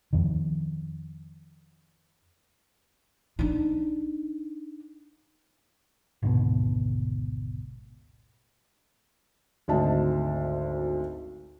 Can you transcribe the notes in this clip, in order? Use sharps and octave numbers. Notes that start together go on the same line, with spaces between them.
F2 D#3
D4 D#4
G#1 D2 G#2 B2
G#1 D2 D#5 A5